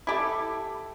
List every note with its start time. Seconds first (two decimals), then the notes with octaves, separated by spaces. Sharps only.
0.07 E4 G4 A4